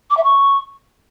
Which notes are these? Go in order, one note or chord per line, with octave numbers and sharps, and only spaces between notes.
D6
E5
C#6